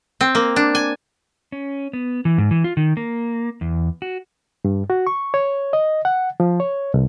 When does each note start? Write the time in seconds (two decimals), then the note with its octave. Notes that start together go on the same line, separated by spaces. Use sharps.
0.21 C4
0.35 A#3
0.56 D4
0.75 G#5
1.52 C#4
1.93 B3
2.25 E3
2.38 G#2
2.51 E3
2.64 F4
2.77 D#3
2.97 A#3
3.61 E2
4.02 F#4
4.65 G2
4.90 F#4
5.07 C#6
5.34 C#5
5.73 D#5
6.05 F#5
6.40 F3
6.60 C#5
6.94 C2